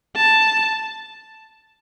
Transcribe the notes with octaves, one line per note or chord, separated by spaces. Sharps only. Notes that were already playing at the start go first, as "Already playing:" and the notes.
A5